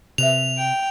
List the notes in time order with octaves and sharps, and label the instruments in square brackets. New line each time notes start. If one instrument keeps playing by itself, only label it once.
[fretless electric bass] C3 [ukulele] B4 D#5 E5 [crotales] F7
[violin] G5